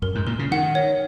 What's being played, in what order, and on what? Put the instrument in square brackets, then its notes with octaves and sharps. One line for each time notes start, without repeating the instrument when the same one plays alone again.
[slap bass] F#2 [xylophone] A#4
[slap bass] G#2
[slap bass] A#2 [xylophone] A#4
[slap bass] C#3
[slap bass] D#3 [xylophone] F#5
[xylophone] C#5